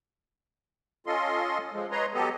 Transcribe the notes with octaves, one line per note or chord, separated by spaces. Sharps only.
C#4 F4 A4 D#5 C6
F3 G#3
B4 C#5 D#5 A#5 C6
F#3 B3 G4 A4 D#5